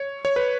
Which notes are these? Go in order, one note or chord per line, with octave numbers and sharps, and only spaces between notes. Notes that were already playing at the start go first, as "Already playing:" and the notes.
Already playing: C#5
C#5
B4